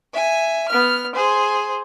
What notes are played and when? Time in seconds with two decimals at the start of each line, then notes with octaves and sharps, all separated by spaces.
0.13 E5 G#5
0.68 B3 F6
1.15 G#4 C5